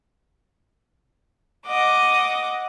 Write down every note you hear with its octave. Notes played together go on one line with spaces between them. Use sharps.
D#5 F#5 D6